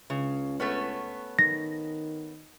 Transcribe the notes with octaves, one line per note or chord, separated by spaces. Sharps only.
C#2 C#3
A3 B3 C#4
D#3 A#6